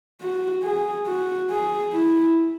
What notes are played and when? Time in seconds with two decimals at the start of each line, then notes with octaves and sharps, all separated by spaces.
0.21 F#4
0.63 G#4
1.07 F#4
1.50 G#4
1.93 E4